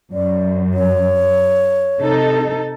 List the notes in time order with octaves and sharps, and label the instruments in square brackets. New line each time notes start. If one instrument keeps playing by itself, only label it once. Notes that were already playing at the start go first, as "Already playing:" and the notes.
[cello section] F#2 [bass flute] D5
[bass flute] C#5
[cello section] C3 D#4 A4